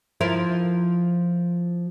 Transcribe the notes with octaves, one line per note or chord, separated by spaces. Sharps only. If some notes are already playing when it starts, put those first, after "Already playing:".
F3 E4 A#4